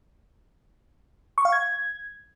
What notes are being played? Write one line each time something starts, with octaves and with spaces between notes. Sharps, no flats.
C#6
F5
G#6